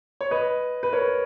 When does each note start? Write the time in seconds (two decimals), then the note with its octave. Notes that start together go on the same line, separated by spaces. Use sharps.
0.21 C#5
0.31 B4 D#5
0.83 B4
0.93 A#4 C#5